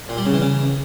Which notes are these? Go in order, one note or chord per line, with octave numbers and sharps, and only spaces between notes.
A#2
G3
C#3
E3
C#3